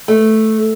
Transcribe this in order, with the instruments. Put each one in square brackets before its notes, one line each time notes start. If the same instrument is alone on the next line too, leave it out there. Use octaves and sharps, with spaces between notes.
[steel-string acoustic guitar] A3